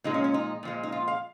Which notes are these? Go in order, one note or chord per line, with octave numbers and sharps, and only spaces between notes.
A#2 F3 G#3 D#4
C#4
C#4
D#4
A#2 F3 G#3
D#4
F4
F5